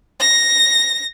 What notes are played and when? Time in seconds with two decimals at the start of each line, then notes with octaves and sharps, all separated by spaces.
0.20 A#6